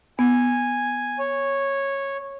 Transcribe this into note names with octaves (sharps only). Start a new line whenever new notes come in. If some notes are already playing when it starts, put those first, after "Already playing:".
B3 G#5
C#5